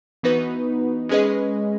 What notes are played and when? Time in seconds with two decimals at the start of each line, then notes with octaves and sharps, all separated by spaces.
0.23 E3 B3 D#4 F#4 B4
1.09 G#3 C#4 G#4 B4 D#5